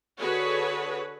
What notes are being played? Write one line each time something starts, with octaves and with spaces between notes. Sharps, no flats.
D3 F#4 G#4 A4 B4 C#5